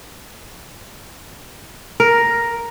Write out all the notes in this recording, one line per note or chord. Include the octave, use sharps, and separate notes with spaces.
A#4